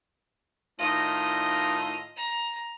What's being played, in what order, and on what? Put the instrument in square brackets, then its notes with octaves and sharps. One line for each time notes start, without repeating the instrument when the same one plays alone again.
[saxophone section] A2 D#3 F4 [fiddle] D#5
[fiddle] A#5